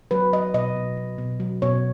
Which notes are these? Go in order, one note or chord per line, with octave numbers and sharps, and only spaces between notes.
F#3 B4
F#3 D#5
B2 D#5
B2
F#3
B2
F#3
B2 C#5